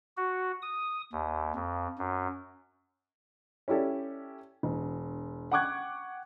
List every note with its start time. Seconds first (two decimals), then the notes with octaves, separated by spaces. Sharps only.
0.17 F#4
0.62 D#6
1.12 D#2
1.55 F2
1.98 F#2
3.68 C#4 E4 G4 A4 D5
4.63 E1
5.52 F#5 G5 C#6 D6 F#6 G#6